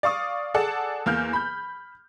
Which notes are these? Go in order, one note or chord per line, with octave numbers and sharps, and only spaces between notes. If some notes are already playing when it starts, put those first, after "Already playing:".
D5 F5 C#6 D#6
G#4 A4 D5 F#5 A5
E2 A#3 F6 G6
B5 G6